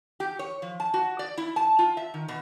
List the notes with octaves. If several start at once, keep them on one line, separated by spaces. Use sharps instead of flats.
G4
C#5
F3
A5
F#4
D5
E4
A5
F4
E5
D#3
B2